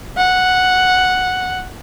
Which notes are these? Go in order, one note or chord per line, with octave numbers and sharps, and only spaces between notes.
F#5